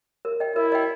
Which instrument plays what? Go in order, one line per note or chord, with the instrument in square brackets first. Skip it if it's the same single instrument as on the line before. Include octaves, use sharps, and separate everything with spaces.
[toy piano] A#4
D#5 G5
[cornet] E4 [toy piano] A#4
[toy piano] D#5 G5